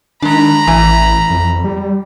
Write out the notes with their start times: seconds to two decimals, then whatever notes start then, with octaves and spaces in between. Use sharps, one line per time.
0.22 D#3 G#3 D4 A#5 B5
0.67 A1 E3 G#5
1.30 F2
1.64 G3